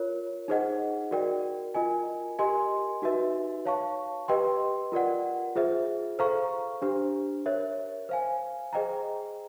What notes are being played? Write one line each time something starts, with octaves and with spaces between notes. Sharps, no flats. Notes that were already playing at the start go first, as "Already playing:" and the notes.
Already playing: F4 A#4 C#5
D#4 G#4 C5 D#5 F#5
F#4 A#4 D5 G5
F4 A#4 D#5 G#5
G4 A#4 D#5 G#5 C6
D#4 F#4 B4 E5
C#5 F5 A5 C#6
G4 B4 D#5 G5 C6
F4 A#4 D5 F#5
F4 G#4 C5 E5
A4 C5 F5 A#5 C#6
D4 G4 C5
A#4 C#5 E5
C5 F5 G#5
G#4 C5 D#5 G5 A#5